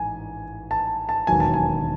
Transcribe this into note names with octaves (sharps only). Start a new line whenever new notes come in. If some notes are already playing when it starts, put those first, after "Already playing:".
Already playing: A1 G#2 G#5
A5
A5
E1 D#2 D#3 F#3 G#5
A5
G#5